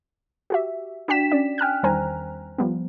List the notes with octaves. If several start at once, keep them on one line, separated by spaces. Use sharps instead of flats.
F#4 G4 E5
D4 F#4 G5 B6 E7
C#4 D5
G5 G#5 F6 F#6
E2 D#3 G3 C5 G#5 A#5
F3 G3 B3